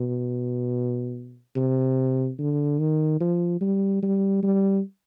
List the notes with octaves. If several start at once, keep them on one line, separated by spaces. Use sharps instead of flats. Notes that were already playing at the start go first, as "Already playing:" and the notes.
Already playing: B2
C3
D3
D#3
F3
G3
G3
G3